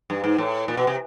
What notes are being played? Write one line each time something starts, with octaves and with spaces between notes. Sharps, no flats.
G2
G#2
A2
A#2
B2
C3